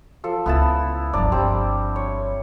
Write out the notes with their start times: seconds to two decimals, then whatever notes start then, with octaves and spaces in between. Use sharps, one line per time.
0.24 F3 A4
0.46 C#2 B3 E4 A5
1.13 G1 F3 D4 D5 A#5
1.32 G3 C4 D6
1.96 C#5